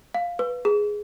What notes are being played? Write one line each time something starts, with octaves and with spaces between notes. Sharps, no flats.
F5
B4
G#4